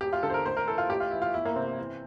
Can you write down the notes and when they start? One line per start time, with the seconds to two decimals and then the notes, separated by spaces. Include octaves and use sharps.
0.01 E1 G4
0.13 F4
0.23 D3 A4
0.30 C5
0.34 A#4
0.45 A1 C5
0.57 A#4
0.67 E3 A4
0.78 F4
0.89 A1 G4
1.00 F4
1.11 E3 E4
1.22 F4
1.34 G1 E4
1.45 A#3
1.56 C3 C4
1.79 E3